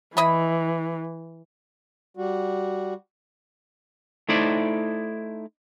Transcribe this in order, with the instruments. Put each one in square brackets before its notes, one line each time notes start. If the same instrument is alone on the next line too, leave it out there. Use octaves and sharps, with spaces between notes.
[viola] E3 [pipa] E4 D#5 B5
[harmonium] G3 F#4
[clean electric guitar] A3 D#4 E4 C5 D5